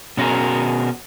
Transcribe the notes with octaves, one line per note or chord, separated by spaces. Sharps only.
B2 C#4 F#4 G#4 A#4